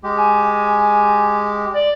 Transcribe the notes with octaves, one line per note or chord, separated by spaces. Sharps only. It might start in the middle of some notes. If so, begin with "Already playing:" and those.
G#3 G4
G#5
D5